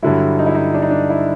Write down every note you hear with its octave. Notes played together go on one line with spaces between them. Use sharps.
G2 D3 F#3 E4
D#4
E4
D#4
D4
D#4
D4
E4